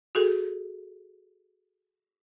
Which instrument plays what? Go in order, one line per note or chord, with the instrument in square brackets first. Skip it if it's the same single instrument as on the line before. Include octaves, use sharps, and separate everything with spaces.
[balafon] F#4 G#4 A4